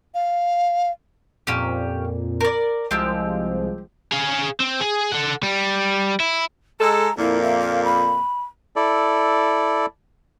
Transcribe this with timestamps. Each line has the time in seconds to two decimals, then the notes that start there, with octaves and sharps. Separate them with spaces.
0.14 F5
1.47 F2 A#2 C#4 G4
2.41 A#4 D5
2.91 C2 F3 G#3 C4 G4
4.12 G#4 F5
4.60 C4
4.80 G#4
5.12 A4 F#5
5.43 G3
6.20 E4
6.81 G#3 A4 A#5
7.18 F2 A#2 A#3 E4
7.42 E5
7.59 F5
7.84 B5
8.76 E4 A4 D5